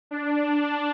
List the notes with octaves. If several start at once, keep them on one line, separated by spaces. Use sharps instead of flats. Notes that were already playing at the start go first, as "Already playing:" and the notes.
D4
D4